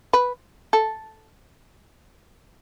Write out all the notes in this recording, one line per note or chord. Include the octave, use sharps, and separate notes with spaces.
B4
A4